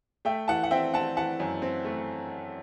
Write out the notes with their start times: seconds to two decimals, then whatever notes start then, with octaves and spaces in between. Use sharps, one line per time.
0.25 A3 E5 G5
0.48 E3 F#5 A5
0.64 F#5
0.71 C4 E5 G5
0.94 C4 F#5 A5
1.17 E3 F#5 A5
1.40 F#2
1.62 C4
1.85 A3